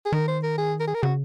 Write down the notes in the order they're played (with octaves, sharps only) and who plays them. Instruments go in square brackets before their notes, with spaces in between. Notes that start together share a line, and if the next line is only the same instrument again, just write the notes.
[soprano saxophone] G#4
[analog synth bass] D#3 [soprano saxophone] A#4
[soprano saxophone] C5
A#4
G#4
A#4
G#4
A#4
[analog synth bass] C#3 [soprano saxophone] F#4